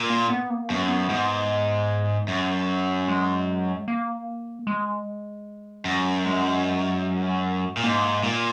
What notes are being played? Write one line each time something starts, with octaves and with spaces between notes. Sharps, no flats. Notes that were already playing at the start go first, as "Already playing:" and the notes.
Already playing: A#2
A#3
B3
A#3
F#2 B3
B3
G#2
F#2
G#3
A#3
G#3
F#2
G#3
A#2
G#2 A#3
A#2